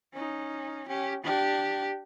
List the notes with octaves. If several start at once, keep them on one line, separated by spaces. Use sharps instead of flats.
C#4 D#4
C#4 G4
D4 G4